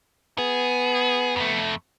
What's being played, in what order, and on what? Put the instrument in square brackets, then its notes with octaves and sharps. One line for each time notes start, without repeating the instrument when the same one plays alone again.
[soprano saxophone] B3 [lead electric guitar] G#4
[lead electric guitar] F2 A3